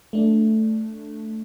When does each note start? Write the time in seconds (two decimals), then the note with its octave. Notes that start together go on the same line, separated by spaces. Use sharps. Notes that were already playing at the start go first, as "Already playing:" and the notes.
0.13 A3 D4